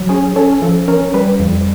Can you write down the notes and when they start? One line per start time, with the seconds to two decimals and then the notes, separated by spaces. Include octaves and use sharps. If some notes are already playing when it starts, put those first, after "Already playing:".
Already playing: F#3
0.09 C#4 G#4
0.36 C#4 A4
0.62 F3 A4
0.88 C#4 A#4
1.14 G3 B4
1.40 F2